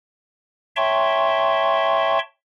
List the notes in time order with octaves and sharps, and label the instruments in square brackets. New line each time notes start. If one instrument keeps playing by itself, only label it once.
[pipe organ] C#5 E5 G5 A5 C6 C#6